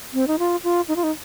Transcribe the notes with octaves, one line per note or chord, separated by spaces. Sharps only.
C4
D#4
F4
F4
D#4
F4
D#4